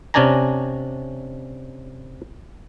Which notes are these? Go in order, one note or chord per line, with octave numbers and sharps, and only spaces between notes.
C3 C#4 D4 D5 G#5 A#5